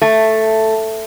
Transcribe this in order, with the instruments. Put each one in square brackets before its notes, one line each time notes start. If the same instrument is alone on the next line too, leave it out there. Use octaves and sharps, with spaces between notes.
[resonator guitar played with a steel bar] A3